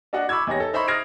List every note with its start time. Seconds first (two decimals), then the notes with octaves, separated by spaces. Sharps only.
0.13 D4 F#4 D#5 F#5
0.29 B5 C#6 D6 E6 G#6
0.47 E2 D#4 G4 C#5 A#6
0.60 A4
0.73 D#4 C5 E5 B5 C#6
0.88 D#6 F6 G#6 A#6 C7 D7